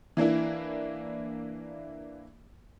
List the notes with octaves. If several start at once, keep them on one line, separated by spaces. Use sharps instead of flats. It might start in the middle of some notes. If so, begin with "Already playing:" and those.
E3 A#3 D4 E4